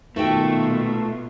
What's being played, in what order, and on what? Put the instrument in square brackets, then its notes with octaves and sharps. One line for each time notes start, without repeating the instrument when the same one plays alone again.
[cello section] B2 A#3 F4 [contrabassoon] D#3 [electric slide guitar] A3 [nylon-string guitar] F#4 E5 G5